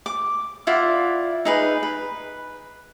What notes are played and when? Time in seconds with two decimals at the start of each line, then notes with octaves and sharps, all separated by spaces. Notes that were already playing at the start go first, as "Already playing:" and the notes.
0.06 D6
0.67 E4 F4 D5 F#5
1.45 D#4 G#4 B4
1.83 B4